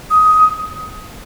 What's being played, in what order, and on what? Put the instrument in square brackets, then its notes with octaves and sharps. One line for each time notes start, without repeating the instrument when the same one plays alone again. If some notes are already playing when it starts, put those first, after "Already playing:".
[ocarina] D#6